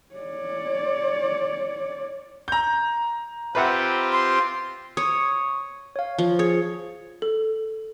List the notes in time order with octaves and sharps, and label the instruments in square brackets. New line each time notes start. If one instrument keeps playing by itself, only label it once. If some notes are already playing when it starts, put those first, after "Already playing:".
[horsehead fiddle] C#5 D5
[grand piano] A#5 G6
[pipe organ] C4 F4 G4 [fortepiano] B4 E5 F#5
[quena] C6
[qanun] C#5 [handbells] C#6 D#6
[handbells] C#5 F5
[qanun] F3
[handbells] G#4 G#6 [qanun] C#5
[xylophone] A4